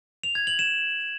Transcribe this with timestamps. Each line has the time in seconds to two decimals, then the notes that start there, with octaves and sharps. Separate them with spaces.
0.23 F7
0.35 G#6
0.47 F#7
0.59 E7